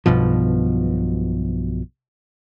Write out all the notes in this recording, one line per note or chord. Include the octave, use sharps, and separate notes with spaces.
B1 G2 B2 F3